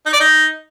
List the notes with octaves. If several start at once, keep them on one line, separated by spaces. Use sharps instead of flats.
D#4
D5
D#4